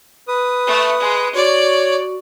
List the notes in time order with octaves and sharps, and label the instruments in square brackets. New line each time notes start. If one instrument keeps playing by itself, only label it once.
[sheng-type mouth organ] B4 D#6
[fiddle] A3
G#3
[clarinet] F#4 [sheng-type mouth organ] C#5 [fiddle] D5